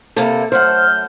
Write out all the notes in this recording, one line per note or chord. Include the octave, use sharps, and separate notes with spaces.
C3 A#3 E4 A4
F#2 A3 C5 F#5 F6 G6